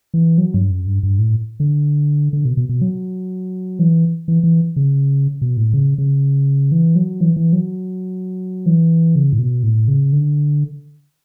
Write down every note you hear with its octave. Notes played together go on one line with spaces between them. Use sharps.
E3
F#3
G2
F#2
G2
G2
A2
D3
D3
B2
B2
B2
F#3
E3
E3
E3
C#3
B2
A2
C#3
C#3
E3
F#3
E3
E3
F#3
E3
C#3
A2
B2
A2
C#3
D3